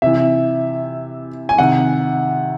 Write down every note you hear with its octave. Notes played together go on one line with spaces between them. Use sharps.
C3 E3 E5
G#5
C3 D#3 F#5